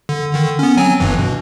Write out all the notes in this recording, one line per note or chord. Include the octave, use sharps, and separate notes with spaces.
D3
D3 D#3
B3 C#4
F#3 C4 G#5
G1 G2 E3
B2